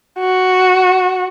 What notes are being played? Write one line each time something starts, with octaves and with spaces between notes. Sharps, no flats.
F#4